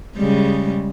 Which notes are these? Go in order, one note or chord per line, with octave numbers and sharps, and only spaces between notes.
C#3 G3 G#3